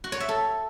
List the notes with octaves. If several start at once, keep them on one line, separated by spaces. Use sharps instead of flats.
F#4
C#5
E5
A4